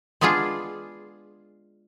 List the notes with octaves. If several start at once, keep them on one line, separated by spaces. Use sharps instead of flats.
G#3 B3 D4 F4 G#4